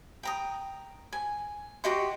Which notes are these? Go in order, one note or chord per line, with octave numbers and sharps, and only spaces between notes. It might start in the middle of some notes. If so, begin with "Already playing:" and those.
G5 A#5 D#6
G#5
F#4 G4 D#5 C6